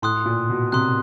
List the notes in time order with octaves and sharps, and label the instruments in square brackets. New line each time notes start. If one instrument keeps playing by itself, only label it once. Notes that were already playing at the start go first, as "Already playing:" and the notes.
[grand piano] A2 [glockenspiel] C6 D#6 F#6
[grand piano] A#2
B2
[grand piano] C3 [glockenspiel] C6 D#6 F#6